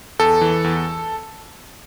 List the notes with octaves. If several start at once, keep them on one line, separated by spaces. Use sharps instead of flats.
E2 A4
E3
E2